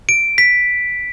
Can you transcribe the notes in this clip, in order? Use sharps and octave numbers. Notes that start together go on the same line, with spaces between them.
D7
B6